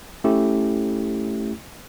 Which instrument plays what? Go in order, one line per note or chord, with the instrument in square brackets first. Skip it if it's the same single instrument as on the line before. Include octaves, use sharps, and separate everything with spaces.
[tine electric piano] A3 C#4 E4 G4